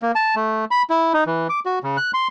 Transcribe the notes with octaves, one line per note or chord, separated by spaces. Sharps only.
A#3
A5
A3
B5
E4
D#4
E3
D6
F#4
C#3
F#6
C6